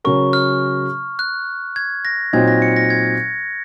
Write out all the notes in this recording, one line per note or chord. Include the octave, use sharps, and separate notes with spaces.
C#3 F#3 C#4 F#4 A#4 C#6
F6
F#6
G#6
A#6
A#2 F#3 C4 D#4 G#6
A#6
C#7
A#6
G#6